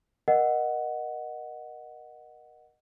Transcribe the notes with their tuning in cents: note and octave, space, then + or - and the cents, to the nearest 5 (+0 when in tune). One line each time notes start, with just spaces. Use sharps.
A#4 +25 D#5 -15 F#5 +0